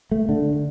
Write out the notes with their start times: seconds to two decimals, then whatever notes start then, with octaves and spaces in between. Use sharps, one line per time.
0.11 A3
0.29 D3